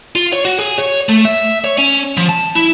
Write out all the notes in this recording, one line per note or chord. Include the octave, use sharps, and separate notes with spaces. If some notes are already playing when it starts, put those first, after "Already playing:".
F4
C#5
F#4
G#4
C#5
A3
E5
C#5
C#4
F3
A5
E4